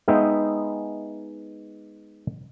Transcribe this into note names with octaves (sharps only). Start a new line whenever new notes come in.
G#3 B3 D#4 E5 G5